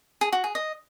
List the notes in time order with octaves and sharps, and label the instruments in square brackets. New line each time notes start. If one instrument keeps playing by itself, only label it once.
[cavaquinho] G#4
F#4
G#4
D#5